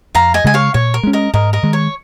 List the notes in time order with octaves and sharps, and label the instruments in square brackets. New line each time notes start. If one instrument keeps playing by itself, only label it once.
[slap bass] F2 [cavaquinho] F5 A#5
[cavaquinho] D#5 G#5
[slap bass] C#3 G#3 [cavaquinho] G#5
[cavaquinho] C#5 F5
[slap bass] A#2 [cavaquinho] C#5
[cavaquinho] A#4
[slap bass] G#3 C#4
[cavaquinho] A#4 D#5
[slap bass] G#2 [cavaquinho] A#4 D#5
[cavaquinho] A#4 D#5
[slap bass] D#3 G#3
[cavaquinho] C#5